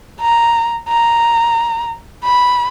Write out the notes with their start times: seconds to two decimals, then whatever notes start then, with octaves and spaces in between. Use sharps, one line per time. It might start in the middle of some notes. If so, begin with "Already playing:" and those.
0.21 A#5
0.89 A#5
2.25 B5